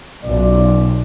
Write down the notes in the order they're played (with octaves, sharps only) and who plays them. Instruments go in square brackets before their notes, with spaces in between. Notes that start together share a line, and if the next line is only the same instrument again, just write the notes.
[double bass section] B1 [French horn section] F#2 F4 D5